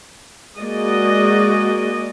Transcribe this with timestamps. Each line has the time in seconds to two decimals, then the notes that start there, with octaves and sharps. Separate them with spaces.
0.58 G#3 A#3 F#4 D5 D#5